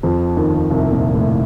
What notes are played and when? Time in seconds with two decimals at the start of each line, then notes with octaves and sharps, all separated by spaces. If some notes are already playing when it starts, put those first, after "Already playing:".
0.03 F2 F3
0.37 D#2 D#3
0.53 D#2 D#3
0.70 C2 C3
0.93 A#2
1.15 A2